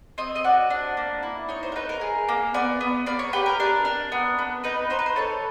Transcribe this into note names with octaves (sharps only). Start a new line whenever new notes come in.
C4 D#5
D#5
F#4 D5
D4
A#3
E4
D#4 C#5
C5
A#4
D#4 B4
A#4
G#4
A#3
B3 D5
B3
A#3 D5
C#5
G4 B4
A#4
D4 A#4
D4
B3
B3
D#4 B4
D#4 C5
B4
C5
A4 C#5